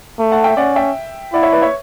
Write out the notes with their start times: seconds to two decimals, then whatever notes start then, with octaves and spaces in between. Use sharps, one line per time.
0.19 A3
0.31 F#5 A5
0.44 E5 G5
0.57 C#4 D5 F#5
0.76 E5 G5
1.33 E4 D5 F#5
1.43 C#5 E5
1.52 B4 D5
1.62 C#5 E5